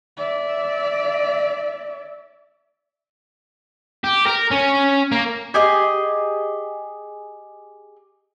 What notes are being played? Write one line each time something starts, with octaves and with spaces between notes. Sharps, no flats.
D5 E5
G4
A#4
C#4
A#3
G4 G#4 D#5